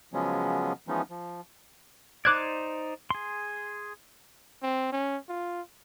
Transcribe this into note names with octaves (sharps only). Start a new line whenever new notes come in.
C#3 F3 F#3 G#3 B3 C#4
E3 F3 G#3 B3 C#4 D#4
F3
D#4 C5 D5 D6 F#6 G#6
G#4 C6
C4
C#4
F4